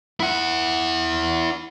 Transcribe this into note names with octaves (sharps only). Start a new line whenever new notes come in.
E4 F#5